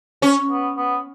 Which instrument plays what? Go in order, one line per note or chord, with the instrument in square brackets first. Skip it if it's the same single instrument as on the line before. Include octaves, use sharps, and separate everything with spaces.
[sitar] C#4
[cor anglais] B3
B3